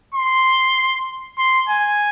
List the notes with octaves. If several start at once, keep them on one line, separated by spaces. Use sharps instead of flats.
C6
C6
G#5